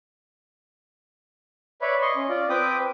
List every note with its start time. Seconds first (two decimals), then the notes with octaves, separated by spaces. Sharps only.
1.82 B4 C#5 D5 E5 B5
2.01 D#5 C6 C#6
2.16 C#4
2.29 F4 D5
2.49 C4 B4 G5 D6 D#6